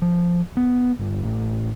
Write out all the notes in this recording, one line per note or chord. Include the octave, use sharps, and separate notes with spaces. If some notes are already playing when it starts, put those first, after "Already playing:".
F3
B3
G1
A1